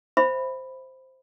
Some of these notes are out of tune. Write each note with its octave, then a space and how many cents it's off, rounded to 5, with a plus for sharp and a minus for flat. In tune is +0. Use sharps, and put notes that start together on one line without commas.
C5 +0 E5 +0 B5 +0